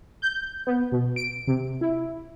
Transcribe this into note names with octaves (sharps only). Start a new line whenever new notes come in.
G6
B3
B2
D7
C3
E4